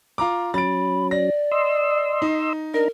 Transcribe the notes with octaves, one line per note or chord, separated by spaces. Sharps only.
F4 A#5 D6
F#3 C#4 B5 A6 D7
D5 A#6
D#5 C6 E6
D#4
D4 D#4 A#4 A#5